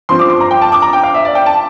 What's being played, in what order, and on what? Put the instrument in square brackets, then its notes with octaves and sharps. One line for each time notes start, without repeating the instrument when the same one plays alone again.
[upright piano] G2 F3 C4 C6
D6
C6
A#5
G5
A5
D6
A#5
G5
F5
E5
D5
G5
A5